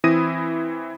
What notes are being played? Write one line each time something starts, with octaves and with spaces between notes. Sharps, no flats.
E3 C4 E4 D#6 A#6 D#7